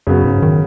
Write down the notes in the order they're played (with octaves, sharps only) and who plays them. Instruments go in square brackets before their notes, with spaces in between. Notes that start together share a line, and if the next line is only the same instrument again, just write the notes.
[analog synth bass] F#2 [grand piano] C#3 F#3 B3
[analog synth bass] G#2
D#3